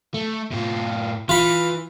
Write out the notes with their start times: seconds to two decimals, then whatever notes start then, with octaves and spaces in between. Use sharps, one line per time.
0.14 A3
0.51 A2 F4
1.29 E3 F4 B5